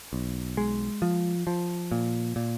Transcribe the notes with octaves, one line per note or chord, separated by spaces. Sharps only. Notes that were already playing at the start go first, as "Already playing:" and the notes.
B1
G#3
F3
F3
A#2
A#2